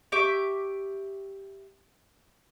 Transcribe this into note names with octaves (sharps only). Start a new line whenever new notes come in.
G4 E5 C#6 D6